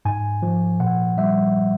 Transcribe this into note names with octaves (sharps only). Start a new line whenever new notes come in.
G#2 G#5
F3
A#2 F#5
G3 E5